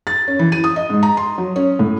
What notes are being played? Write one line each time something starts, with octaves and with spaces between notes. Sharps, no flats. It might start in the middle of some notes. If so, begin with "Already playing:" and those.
A6
C#4
E3
D#7
D#6
D#5
G#2
A#5
C6
F#3
C#4
A2